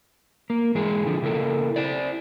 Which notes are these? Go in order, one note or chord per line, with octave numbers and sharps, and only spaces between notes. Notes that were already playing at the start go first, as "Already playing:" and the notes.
A#3
G#2 E3 G#3 G#4
D3 F3
C#3 A#3 E4 A4
E4 C5 D5